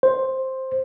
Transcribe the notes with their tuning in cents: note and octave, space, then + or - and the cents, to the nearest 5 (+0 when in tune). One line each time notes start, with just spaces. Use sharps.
C5 +5